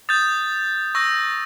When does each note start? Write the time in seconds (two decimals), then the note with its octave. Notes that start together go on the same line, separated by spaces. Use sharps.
0.09 D#6 G6 A6
0.95 C#6 E6 G6 A#6